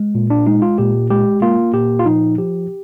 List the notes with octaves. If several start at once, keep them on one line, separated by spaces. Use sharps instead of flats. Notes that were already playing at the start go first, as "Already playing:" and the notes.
Already playing: G#3
A#2
D4
G#3 D#4
F4
A#2 G4
G#3 G4
A#3 F4
A#2 G4
F4
F3 D#4
F3 G4